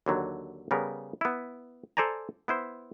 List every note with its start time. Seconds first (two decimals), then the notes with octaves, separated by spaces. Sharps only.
0.06 D#2 D3 F#3
0.71 C#3 G3 B3 A#4
1.21 B3 E4
1.97 A4 C5 D5 G#5 A#5
2.48 B3 E4 C5